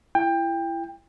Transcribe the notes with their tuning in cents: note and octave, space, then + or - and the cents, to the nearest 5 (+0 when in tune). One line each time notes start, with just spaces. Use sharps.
E4 +25 G5 +20